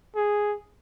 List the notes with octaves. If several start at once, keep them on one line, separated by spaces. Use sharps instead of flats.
G#4